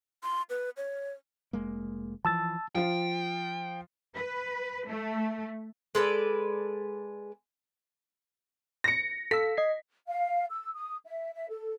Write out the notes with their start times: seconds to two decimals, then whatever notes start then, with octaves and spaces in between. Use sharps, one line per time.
0.23 C6
0.50 B4
0.77 C#5
1.53 F1 G#3 A#3
2.25 E3 F3 A5 E6 A6
2.75 F3 F4 G5
4.14 B4
4.88 A3
5.95 G#3 A4 B4 D5
8.84 A#6 C#7
9.31 A4 F5 E6 B6
9.57 D#5 G#6 C7
10.07 F5
10.51 E6
10.74 D#6
11.05 E5
11.34 E5
11.49 A4